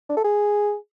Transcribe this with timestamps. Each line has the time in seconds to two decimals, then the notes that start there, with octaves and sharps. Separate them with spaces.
0.09 D4
0.17 A4
0.24 G#4